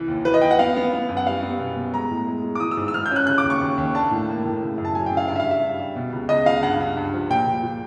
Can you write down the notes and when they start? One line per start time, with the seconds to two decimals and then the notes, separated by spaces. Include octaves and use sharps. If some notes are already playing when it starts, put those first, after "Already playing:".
Already playing: C2 E3
0.08 D#2
0.25 E3 B4
0.34 D#5
0.42 D#2 G5
0.51 F#5
0.59 B3 F5
0.76 B3
0.93 B3
1.09 F#2
1.17 F#5
1.26 G3 F5
1.43 B3
1.59 B2
1.76 B2
1.93 G#3 A#5
2.11 A2
2.26 G#3
2.44 G#3
2.55 D6
2.60 E3 D#6
2.71 E6
2.77 G#2
2.88 E6
2.94 G#2 F6
3.06 G6
3.11 C#4
3.16 F#6
3.27 C#3 F#6
3.38 D6
3.44 D#2
3.50 C#6
3.61 D#2
3.78 D#2
3.95 D4 A5
4.11 A2
4.29 A#3
4.45 A2
4.62 C#3
4.78 F#2
4.85 A5
4.95 F#3 G#5
5.06 G5
5.11 C#3
5.17 F5
5.28 G2 F5
5.36 E5
5.40 F5
5.45 G3
5.51 E5
5.63 G2
5.79 G3
5.96 B2
6.13 C#2
6.29 C#2 D#5
6.46 C#2 F5
6.62 G2 F#5
6.80 G2
6.97 G2
7.14 F3
7.30 A#2 G5
7.47 A#2
7.63 A#2